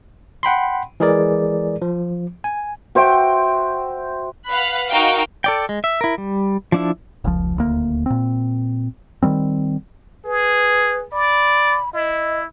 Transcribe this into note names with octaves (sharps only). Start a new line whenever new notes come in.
F#5 G5 B5 C6
E3 G#3 G#4 A#4 D5
F3
G#5
F#4 C5 E5 G5
B4 F5 F#5 B5 F#6
D#4 F#4 A#4 F5 G5
A4 D5 G5
G#3
E5
E4 A#4
G3
F3 D4 E4
F1 C#2 F3
D#1 D2 A#3
A#2 C4
D#3 E3 G3 C4
G#4 B4
D5 B5
E4 D#5